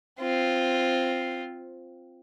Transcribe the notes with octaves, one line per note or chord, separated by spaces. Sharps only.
C4 F4